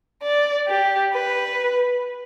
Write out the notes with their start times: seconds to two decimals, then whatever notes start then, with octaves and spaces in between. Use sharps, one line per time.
0.23 D5
0.68 G4
1.13 B4